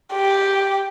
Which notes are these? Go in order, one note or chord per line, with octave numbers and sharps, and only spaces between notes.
G4